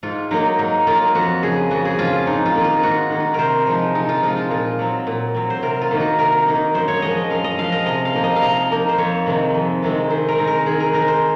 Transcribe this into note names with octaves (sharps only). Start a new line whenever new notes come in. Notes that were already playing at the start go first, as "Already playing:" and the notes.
G#2 F4
F#3 A#3 D#4
G#2 D#4
F#3 A#3 F4
F2 F#4
C#3 F3 G#4
F2 F#4
G#4
C#3 F3 F4
F4
G#2 D#4
F4
D#3 A#3
F4
G#2 F#4
D#3 A#3
F4
C3 A#4 C5
F3 G#3 D#4
C3 D#4
F4
F3 G#3 D#4 F4
F4
A#2 F4
F#3 C4
A#2
F#3 C4
C5
C3 A#4
F4
D#3 A#3 D#4
F#4
C3 A#4
D#3 A#3 D#4
F#2 C5
C#5
F3 G#3 D#5
D#5
F#2 F5
D#5
F3 G#3 F5
D#5
C3 D#5
F5
F3 A#3 D#4
D#5
F5
C3 D#5
F3 A#3 D#4
C5
F2 C#5
C3 D#3 G#3 C4
F2
C3 D#3 G#3 C4
D#3 C5
A#4
G#3 C4 D#4
A#4
D#3 G#4
A#4
G#3 C4 D#4 A#4
C5